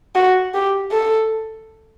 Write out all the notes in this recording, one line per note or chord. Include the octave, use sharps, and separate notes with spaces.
F#4
G4
A4